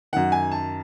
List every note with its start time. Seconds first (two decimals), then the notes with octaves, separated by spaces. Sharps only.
0.13 F#2 D#3 F#5
0.32 G#5
0.51 A5